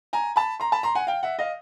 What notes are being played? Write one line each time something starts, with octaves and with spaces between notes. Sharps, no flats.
G#5 A#5
A5 B5
A#5 C6
A5 B5
A#5 C6
F#5 G#5
F5 G5
E5 F#5
D#5 F5